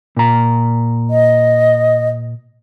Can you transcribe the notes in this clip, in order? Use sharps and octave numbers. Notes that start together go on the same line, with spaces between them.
A#2 A#5
D#5